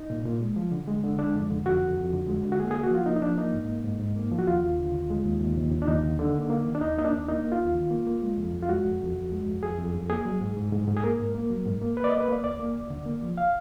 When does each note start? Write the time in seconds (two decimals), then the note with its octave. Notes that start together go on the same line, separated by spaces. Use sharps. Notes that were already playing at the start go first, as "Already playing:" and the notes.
Already playing: D#4
0.10 A#2
0.25 A#2
0.41 G#3
0.56 F3
0.72 D3
0.88 G#3
1.03 D3
1.19 G#3 D4
1.35 F2
1.50 D3
1.65 F2 F#4
1.82 F2
1.97 F2
2.13 D3
2.28 G#3
2.43 D3
2.52 F#4
2.59 A#3 G#4
2.71 A#3 G#4
2.83 F#4
2.91 F3 F4
3.06 A#3 D#4
3.16 D#4
3.22 F3 D4
3.37 A#3 D#4
3.53 G#2
3.69 A#3
3.85 G#2
4.00 G#2
4.16 A#3
4.32 F3
4.38 F#4
4.47 D#2 F4
4.62 D#2
4.79 D3
4.95 D#2
5.10 G#3
5.25 D#2
5.41 D#2
5.57 D#2
5.72 D#2
5.82 D4
5.87 D#2 D#4
6.03 D3
6.19 D3
6.35 A#3
6.50 A#3
6.66 D#3
6.75 D4
6.81 D#2 D#4
6.97 A#3 D#4
7.05 D4
7.13 D#2
7.28 A#3 D#4
7.44 A#3
7.52 F4
7.60 D#2
7.75 D#3
7.91 A#3
8.07 A#3
8.22 G#3
8.38 F2
8.53 F2
8.62 F4
8.69 G#3 F#4
8.84 F2
9.00 F2
9.16 F2
9.32 G#3
9.47 F2
9.63 F2 G#4
9.79 F2
9.94 F2
10.10 A#3 G#4
10.25 F#3
10.41 G#2
10.57 G#2
10.72 G#2
10.87 G#2
10.97 G#4
11.03 A#3 A#4
11.19 G#2
11.35 A#3
11.50 F#3
11.66 G#2
11.82 A#3
11.97 A#3 B4
12.04 D5
12.09 A#3 D#5
12.21 B4
12.28 A#3 D5
12.44 D2 D5
12.59 A#3
12.76 D2
12.90 D3
13.06 A#3
13.23 F3
13.37 F5